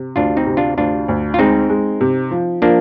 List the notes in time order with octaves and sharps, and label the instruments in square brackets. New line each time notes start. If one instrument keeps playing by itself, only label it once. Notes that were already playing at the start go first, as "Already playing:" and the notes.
Already playing: [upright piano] C3
[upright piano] D2 [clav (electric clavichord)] D4 F4
[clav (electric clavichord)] C4 D#4
[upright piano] C3
[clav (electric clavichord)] D4 F4
[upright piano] D2 [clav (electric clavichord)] D4 F4
[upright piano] D2
[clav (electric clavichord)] F4
[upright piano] G#3 [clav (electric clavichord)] C4 D#4
[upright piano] G#3
C3
F3
[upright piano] F3 [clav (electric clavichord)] A#3 D4